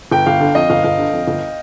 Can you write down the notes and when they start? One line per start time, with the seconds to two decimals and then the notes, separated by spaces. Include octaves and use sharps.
0.12 G1 G5
0.26 G1 F5
0.40 D3
0.55 F2 D#5
0.69 G1 F5
0.84 G1 F5
0.98 D3
1.13 F2
1.27 G1